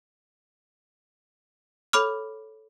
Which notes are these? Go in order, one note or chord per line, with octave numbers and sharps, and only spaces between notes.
A4 C#5 B5 D6 F6